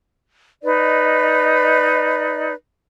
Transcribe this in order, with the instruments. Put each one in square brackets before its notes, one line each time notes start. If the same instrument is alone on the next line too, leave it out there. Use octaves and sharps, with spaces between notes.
[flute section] D#4 B4 D5 D#5